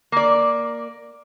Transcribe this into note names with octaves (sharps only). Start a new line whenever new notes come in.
A#3 D5